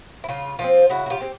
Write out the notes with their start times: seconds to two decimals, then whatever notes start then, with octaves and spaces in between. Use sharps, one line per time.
0.24 E4
0.29 C#3 F4
0.59 F3 G#3 C4 F4
0.89 C#3 E4 F#4
1.06 F#4
1.10 F4 G4
1.21 G#3 C4